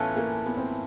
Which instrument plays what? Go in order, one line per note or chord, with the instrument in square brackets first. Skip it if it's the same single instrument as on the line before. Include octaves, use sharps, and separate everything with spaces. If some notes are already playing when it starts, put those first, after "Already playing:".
Already playing: [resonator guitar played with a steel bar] A2 E3 A3 C#4 F4 [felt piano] B3
[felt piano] A#3
B3
C4